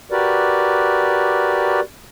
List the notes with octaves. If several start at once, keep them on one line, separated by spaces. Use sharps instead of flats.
F#4 G4 A#4 B4 D5